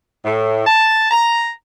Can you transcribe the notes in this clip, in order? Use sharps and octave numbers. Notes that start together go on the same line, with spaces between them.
A2
A5
A#5